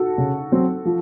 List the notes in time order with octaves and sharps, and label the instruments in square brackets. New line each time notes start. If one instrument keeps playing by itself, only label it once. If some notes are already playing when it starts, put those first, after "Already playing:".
Already playing: [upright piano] F#4 A4
[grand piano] C#3
F#3 C4
F3